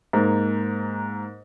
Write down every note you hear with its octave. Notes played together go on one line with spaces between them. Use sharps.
G#2 A#3